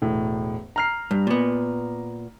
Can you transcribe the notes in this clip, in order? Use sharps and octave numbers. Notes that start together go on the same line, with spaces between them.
E1 A2
A#5 F6 C7
G2
A#2 B3